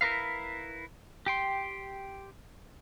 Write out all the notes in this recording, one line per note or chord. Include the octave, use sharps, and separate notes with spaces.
E4 A#4 B4 F5
G4 G5 C6